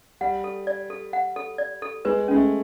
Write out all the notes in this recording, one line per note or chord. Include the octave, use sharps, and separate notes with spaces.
G3 F#5
A4
D5
A4
F#5
A4
D5
A4
G#3 B4
G#3 C#4
A3